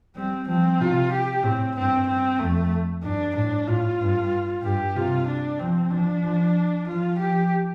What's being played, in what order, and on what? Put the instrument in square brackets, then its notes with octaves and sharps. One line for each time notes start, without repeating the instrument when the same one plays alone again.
[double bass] G3 [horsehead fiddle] C4
[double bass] F3 [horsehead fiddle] C4
[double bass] C3 [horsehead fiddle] F4
[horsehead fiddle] G4
[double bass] A2 [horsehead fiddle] C4
[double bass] G2 [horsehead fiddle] C4
[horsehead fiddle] C4
[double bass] F2 [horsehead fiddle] A3
[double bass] G2 [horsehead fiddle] D4
[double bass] A2 [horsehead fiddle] D4
[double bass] A2 [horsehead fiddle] F4
[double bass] G2
[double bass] G2 [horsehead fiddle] G4
[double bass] C3 [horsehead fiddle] F4
[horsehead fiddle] D4
[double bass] F3 [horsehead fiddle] C4
[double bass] F3 [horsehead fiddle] D4
[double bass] F3
[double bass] F3 [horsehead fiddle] F4
[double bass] F3 [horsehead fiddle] G4